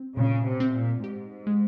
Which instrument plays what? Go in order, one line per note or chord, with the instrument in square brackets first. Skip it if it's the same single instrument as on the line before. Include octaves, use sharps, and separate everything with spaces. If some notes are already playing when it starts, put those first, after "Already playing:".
Already playing: [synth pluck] C4
[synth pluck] A#2 [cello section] C#3
[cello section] C3
[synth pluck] C4
[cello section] A#2
[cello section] G#2 [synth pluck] G4
[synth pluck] G#3